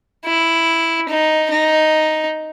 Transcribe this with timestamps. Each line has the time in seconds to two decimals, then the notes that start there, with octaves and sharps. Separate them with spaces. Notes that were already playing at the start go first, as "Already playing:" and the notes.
0.25 E4
1.09 D#4
1.51 D#4